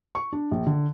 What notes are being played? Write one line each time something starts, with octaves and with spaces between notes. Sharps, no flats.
C#6
D4
A#1
D3